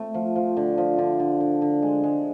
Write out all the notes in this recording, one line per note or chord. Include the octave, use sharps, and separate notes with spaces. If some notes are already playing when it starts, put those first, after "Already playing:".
Already playing: A3 C4
F3
F3
D3
F3
D3
D3
D3
D3
G#3
G#3